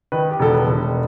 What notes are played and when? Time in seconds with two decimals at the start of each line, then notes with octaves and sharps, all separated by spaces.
0.12 D#3 B4
0.31 G4
0.39 E1 A4
0.54 B4
0.67 E1